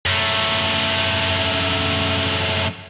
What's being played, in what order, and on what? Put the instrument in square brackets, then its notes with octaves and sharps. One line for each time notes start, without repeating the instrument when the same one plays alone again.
[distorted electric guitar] F#2 A3